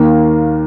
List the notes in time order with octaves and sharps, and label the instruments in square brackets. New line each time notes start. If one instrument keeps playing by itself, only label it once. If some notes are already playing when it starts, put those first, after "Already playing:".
Already playing: [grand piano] D#2 D#3 A#3